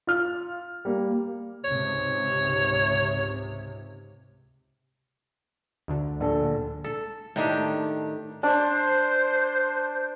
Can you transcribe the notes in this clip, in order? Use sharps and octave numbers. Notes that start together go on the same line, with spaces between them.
F4 F6
G3 A#3
C#2 G#2 C3 C#5
D2 D3
A#1 D4 A4
A4
A2 D#3 D4 G4
D4 C5